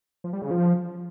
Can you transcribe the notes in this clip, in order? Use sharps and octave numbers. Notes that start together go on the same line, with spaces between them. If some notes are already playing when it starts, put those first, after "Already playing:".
F3
G3
C#3
F3